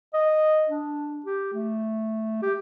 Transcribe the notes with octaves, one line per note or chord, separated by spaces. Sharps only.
D#5
D4
G4
A3
G4